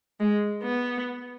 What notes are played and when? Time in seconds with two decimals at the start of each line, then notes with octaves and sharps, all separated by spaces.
0.20 G#3
0.62 B3